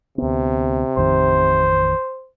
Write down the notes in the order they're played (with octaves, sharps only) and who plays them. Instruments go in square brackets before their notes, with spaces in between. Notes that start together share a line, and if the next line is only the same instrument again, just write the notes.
[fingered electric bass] D2 B3 [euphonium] C3
[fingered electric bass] A1 F2 D#3 [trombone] C5